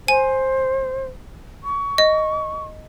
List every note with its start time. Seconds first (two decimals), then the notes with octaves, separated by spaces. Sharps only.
0.08 C5 G#5
1.64 C#6
1.98 D#5